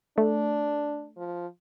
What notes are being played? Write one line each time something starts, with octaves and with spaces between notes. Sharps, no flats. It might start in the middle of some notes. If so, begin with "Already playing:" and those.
A3 D4
F3